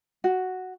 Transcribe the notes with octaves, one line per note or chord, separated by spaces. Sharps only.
F#4